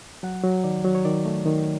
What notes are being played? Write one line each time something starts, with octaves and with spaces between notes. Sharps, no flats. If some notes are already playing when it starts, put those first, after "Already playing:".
F#3 F#5
F#3
D#3 D5
F#3
C#5
D#3 D5
A3
D#3